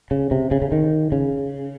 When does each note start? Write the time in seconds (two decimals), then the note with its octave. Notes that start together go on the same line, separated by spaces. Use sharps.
0.11 C#3
0.31 C3
0.51 C#3
0.62 C#3
0.72 D#3
1.12 C#3